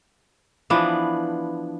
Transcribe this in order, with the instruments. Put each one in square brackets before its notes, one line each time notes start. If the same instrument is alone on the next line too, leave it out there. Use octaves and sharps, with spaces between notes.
[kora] E3 F3 B3 D4